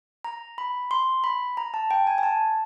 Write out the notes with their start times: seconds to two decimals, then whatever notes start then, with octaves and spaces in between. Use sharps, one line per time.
0.24 A#5
0.58 B5
0.91 C6
1.24 B5
1.57 A#5
1.74 A5
1.91 G5
2.07 G#5
2.18 G#5
2.23 A5